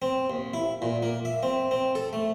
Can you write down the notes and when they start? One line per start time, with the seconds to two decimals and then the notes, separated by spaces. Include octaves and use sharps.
0.02 C4
0.30 D#2
0.54 E4
0.82 A#2
1.03 A#3
1.25 E5
1.43 C4
1.71 C4
1.95 A4
2.13 A3